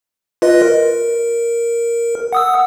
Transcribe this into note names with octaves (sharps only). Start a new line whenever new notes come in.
F4 B4 D#5
A#4
F#5 D#6 E6